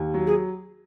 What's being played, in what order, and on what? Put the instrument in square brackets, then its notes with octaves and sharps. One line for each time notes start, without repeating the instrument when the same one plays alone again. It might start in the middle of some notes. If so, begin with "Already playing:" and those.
Already playing: [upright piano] D#2
F#3
[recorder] G#4